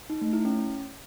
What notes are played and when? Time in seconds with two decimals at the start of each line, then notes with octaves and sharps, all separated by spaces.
0.10 D#4
0.21 A3
0.33 E4
0.45 C#4